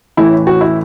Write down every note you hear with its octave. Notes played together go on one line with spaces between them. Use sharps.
A1 A2 E3 E4
F#4
E4